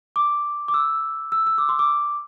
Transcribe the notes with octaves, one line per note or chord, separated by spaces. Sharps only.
D6
D6
E6
E6
E6
D6
C6
D6